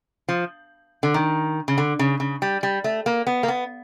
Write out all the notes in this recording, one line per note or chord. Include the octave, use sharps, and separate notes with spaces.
F3
D3
D#3
C#3
D3
C#3
C#3
G3
G3
A3
A#3
B3
A#3
B3